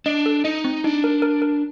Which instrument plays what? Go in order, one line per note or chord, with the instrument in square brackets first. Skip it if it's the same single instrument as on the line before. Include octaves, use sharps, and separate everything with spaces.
[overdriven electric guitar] D4 [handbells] D#5
[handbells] A4
[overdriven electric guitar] D#4 [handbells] D#5
[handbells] C4
[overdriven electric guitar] D4 [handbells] D#4
[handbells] A#4
A#4
A#4